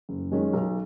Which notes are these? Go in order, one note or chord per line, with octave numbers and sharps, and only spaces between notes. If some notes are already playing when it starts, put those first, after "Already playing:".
F#1
F#2 D#3 G#3 C#4
B1